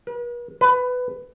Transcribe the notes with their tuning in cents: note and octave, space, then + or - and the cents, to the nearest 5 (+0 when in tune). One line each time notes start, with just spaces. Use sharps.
B4 -45
B4 +15